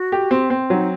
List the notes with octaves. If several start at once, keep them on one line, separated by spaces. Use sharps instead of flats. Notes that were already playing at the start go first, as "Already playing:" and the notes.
Already playing: F#4
G4
C4
C4
F#3 D#4